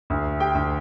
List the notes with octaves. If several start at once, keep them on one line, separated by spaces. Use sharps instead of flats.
D2
G4 G5
D2